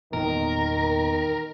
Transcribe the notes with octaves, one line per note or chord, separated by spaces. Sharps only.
E2 A#2 D#3 B3 A#4